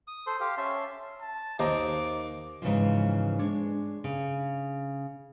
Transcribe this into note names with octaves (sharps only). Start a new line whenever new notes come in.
D#6
A4 C5 C6
G4 F5
C#4 E5 A5 C6
A5
D#2 C5 D#5 A#5 D6
G#2 C#3 E3 F3
G#3 D4 C#5
C#3